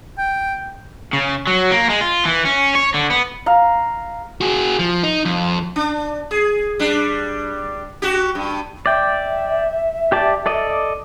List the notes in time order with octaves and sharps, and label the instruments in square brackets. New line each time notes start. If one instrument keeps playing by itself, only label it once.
[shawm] G5
[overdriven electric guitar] C#3
F#3
A#3
G#3
F4
E3
C#4
C#5
D3
B3
[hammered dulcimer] F5 A#5
[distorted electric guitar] F#4 G#4
F3
D#4
F2
[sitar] D4
G#4
G3 D4
F#4 G4
G2
[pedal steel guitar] D5 G5 [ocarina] E5
[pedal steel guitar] G4 D5 A5
A4 D5 D#5